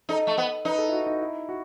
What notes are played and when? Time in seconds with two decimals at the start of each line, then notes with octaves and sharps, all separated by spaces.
0.09 D#4 A4
0.27 A3
0.38 B3
0.65 D#4 B4
0.78 A4
0.88 E4
0.92 F#4
1.07 D#4
1.21 E4
1.49 F#4